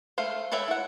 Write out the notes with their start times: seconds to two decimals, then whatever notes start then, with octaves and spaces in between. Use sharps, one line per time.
0.18 A3 C5 F5
0.52 A4 B4 C#5 E5 G5
0.68 E4 F#5